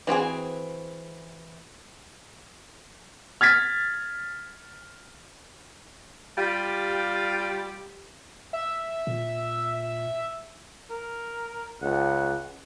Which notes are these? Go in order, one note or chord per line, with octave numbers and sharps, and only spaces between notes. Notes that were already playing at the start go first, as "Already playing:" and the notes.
E3 C4 F#4 G#4
F6 G#6 A6 B6
G3 F4 G4
E5
A#2
A#4
C#2 F#5